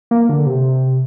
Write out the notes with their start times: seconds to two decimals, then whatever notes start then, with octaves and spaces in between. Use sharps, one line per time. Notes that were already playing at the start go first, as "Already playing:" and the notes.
0.11 A#3
0.29 D3
0.46 C3